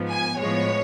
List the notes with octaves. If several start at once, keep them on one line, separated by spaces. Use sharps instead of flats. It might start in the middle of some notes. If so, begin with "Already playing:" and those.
Already playing: G#2 F3 B3
G#5
A2 F3 G#3 B3 C#5